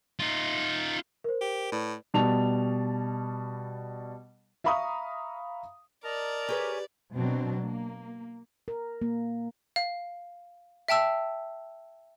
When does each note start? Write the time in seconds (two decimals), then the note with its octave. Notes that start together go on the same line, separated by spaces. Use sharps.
0.19 D#4 F4
1.24 A#4 C5
1.41 G4
1.72 A2 B4 D5
2.14 B2 G3 A5 F7
4.64 E5 F5 A#5 B5 C#6 D#6
6.04 A#4 D5 D#5 A5 A#5
6.49 G4 G#4 B4 C#5 G#5
7.14 B2 F#3 C4 D4
7.62 A#3
8.68 A#4
9.02 A#3
9.76 F5
10.88 E5 G5 A5 E6